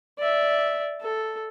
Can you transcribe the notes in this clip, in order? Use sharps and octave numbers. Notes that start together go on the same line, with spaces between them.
D5 E5
A4